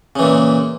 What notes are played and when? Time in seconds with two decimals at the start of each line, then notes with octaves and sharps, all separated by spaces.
0.16 C#3
0.19 E3
0.22 A#2